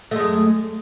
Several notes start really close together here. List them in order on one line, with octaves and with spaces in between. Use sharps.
A3 G#3 F#2